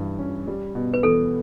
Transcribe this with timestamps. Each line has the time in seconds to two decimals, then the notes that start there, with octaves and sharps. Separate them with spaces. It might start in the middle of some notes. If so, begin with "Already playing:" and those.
Already playing: G2 E3
0.19 C#4
0.47 G3
0.75 B2
0.94 B4
1.03 E2 A4